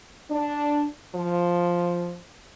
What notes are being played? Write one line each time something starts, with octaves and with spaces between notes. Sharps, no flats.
D4
F3